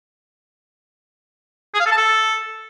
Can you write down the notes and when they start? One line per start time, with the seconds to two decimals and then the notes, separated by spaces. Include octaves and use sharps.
1.74 G#4
1.80 F5
1.86 A4
1.92 A5
1.97 A4